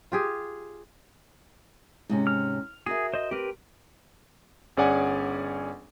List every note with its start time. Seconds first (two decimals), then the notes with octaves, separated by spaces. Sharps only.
0.12 F4 G4 G#4
2.09 G#2 C3 C#4
2.27 F6
2.86 F#4 G#4 A#4 E5
3.14 C5 D#5
3.31 C4 G4 A#4 B4
4.77 G1 C#4 G#4 D5 F#5 G#5